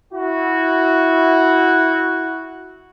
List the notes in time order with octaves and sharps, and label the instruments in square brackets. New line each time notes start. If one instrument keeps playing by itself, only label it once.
[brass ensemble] E4 F#4